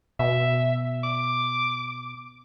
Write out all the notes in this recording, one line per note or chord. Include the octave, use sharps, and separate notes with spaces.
B2 E5
D6